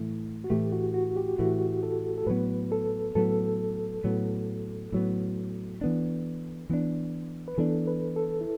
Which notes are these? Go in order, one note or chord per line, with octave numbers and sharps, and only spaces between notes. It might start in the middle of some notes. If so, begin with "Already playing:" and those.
Already playing: A2 E3 A3
F#4
A2 E3 A3 G4
F#4
F#4
G4
A2 E3 A3 F#4
A4
A4
A2 F#3 B3 B4
A4
A2 F#3 B3 A4
A2 F#3 B3
A2 F#3 B3
E3 B3 D4
E3 B3 D4
B4
E3 B3 D4 A4
B4
A4
E4